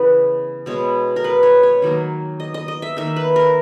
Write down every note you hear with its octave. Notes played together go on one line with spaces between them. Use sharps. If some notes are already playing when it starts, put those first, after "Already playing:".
Already playing: C#3 E3 B3 B4
B2 G#3 B3 C#5
A#4
B4
C#5
C#5
D#3 F#3 A#3
D#5
D#5
D#5
E5
D#3 A#3 E5
B4
A#4